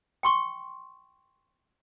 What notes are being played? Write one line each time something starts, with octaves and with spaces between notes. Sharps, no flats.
G5 C6 C#6